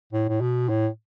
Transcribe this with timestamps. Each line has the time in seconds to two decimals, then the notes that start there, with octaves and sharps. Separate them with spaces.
0.12 A2
0.28 A2
0.41 B2
0.69 A2